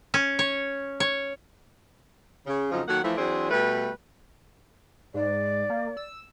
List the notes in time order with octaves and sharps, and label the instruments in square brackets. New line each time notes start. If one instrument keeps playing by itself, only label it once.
[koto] C#4
C#5
C#5
[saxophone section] C#3
F2 C#3 F3 F#3 C#4 D#4
D#3 F#3 A#3 A4 F#5
E3 F3 A3
E3 F#3 C4 D4 G#4 C5
B2 G3 A3 B4
[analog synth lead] G#2 [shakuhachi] D5
[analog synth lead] A#3
E6